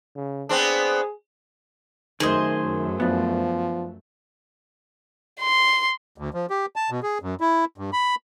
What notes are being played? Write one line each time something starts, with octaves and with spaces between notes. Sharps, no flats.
C#3
B3 C4 D4 G#4
F#2 D#3 A3 G#4 C5 D#5
F3 B3 D4
C6
D2
F3
G4
A5
B2
G#4
F#2
E4
G2
B5